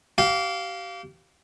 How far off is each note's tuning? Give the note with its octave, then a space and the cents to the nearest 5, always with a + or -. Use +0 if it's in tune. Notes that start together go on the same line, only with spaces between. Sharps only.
G4 -35 F5 +0